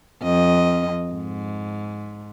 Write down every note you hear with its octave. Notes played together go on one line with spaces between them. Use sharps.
F2 D#5
G#2